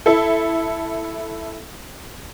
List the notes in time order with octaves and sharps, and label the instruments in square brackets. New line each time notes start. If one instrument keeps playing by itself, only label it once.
[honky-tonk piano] E4 A4